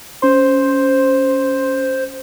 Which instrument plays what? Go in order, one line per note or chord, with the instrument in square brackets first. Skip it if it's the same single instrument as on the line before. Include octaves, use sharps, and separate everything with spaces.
[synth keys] C#4 C6 [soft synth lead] C5